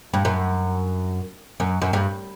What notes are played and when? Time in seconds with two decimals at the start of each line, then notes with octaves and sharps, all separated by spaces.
0.13 G2
0.25 F#2
1.60 F#2
1.82 F#2
1.93 G2